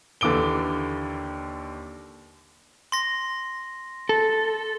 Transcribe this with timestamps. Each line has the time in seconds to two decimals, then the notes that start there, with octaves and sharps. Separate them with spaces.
0.21 D#2 D3 E3 D6 D7 G7
2.92 C6 A#6
4.09 A4